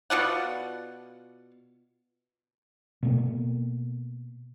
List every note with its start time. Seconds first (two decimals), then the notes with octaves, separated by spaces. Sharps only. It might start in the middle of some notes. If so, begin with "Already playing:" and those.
0.10 B2 F4 D5 F#5
3.03 B2 A3 A#3